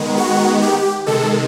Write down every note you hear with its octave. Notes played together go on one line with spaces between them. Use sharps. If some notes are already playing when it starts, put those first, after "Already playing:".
Already playing: D#3 G#3 B3
F#4
G4
C3 D#3 G#3 A4